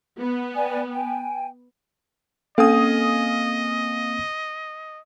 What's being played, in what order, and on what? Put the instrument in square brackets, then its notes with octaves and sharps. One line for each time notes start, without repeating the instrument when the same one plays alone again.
[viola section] B3
[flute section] D5 G5 G#5
G5 G#5
[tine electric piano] A#3 C4 [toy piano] C#4 A4 [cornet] D#5 [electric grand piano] F5 G#5 D#6